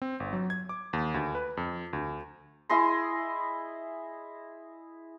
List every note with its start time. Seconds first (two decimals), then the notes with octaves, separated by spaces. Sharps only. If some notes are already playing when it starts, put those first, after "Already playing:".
0.02 C4
0.20 G1
0.33 F#3
0.50 G#6
0.69 D6
0.93 D#2
1.14 D2
1.35 B4
1.57 F2
1.93 D2
2.69 E4 G#4 D#5 C6